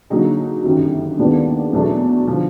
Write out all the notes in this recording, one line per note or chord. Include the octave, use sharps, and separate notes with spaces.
D3 F#3 A#3 D#4 G#4
G1 F#2 D#3 G3
D#2 D#3 G#3 B3 D4
E2 B2 F#3 A3 D4
D3 F3